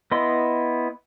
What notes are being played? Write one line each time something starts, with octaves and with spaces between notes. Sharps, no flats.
B3 E4 D#5 C6